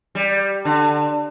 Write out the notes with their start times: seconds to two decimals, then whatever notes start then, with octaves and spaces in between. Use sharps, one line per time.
0.15 G3
0.65 D3